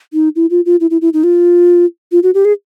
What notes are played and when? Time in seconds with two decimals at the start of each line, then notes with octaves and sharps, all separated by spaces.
0.13 D#4
0.36 E4
0.50 F4
0.66 F4
0.80 E4
0.91 E4
1.01 E4
1.13 D#4
1.24 F4
2.12 F4
2.23 F#4
2.34 G4
2.45 G#4